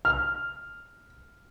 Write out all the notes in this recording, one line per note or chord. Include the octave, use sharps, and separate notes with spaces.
F6